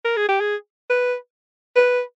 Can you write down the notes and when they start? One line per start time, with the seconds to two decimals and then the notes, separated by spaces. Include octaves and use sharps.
0.05 A#4
0.17 G#4
0.29 G4
0.41 G#4
0.90 B4
1.76 B4